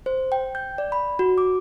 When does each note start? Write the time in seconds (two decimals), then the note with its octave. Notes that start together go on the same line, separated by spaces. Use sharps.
0.06 C5
0.32 G5
0.55 G6
0.78 D5
0.92 B5
1.19 F#4
1.38 D6